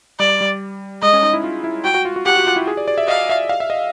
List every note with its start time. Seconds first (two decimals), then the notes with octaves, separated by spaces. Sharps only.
0.20 G3 D5
0.41 G3
1.02 G#3 D#5
1.13 C#4
1.23 D#4
1.33 E4
1.44 F4
1.64 E4
1.84 F#4 G5
1.94 F#4
2.05 F4
2.16 F#4
2.26 G4 F#5
2.37 F#4
2.47 F4
2.56 E4
2.67 G#4
2.77 D5
2.88 D5
2.98 E5
3.08 D#5 F5
3.29 E5
3.49 F5
3.60 E5
3.70 D#5